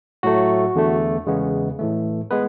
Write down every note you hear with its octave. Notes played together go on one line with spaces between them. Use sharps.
A2 F#3 A3 F#4
E2 D3 A3
E2 C#3 G#3 B3
A2 E3 A3
G#3 B3 B4